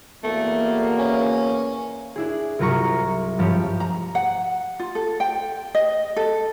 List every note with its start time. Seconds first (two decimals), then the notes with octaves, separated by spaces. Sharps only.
0.24 E2 B2 A3 A#3
0.99 C#4
2.16 D4 E4 G#4
2.59 C2 G2 F#3 F4 A#5 C#6
3.39 G2 F3 C#4 G4
3.80 A#5
4.15 F#5
4.79 F4
4.95 A4
5.20 G5
5.75 D#5
6.16 A4